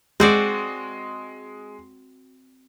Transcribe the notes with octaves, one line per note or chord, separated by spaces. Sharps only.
G#3 C4 F#4 D5